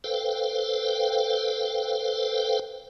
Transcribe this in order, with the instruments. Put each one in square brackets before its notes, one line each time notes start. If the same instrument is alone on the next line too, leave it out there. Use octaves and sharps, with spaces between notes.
[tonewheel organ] A4 B4 C5 F5 G5